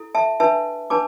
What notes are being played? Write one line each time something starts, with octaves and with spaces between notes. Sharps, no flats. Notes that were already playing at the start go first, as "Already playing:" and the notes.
Already playing: E4 A4
E5 A5
D4 B4 E5 A5
D4 B4 A5 D6